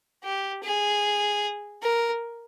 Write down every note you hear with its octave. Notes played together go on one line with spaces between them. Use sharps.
G4
G#4
A#4